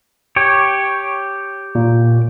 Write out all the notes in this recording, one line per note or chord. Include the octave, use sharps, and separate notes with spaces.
G4 C#5
A#2